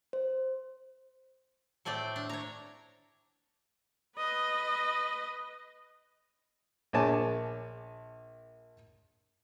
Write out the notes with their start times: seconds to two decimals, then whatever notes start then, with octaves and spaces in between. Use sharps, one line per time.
0.13 C5
1.85 A2 A3 C4 D5 G5
2.16 D4
2.29 C#5 A#5
4.17 B4 D#5
6.93 A#1 G#4 C#5 G#5 A5 D6